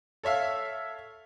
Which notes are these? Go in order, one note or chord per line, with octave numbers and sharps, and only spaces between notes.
A4 C#5 E5 F5